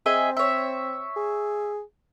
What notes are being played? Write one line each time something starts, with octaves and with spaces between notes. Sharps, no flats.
C4 G#4 D#5 E5
C#5 E5
G#4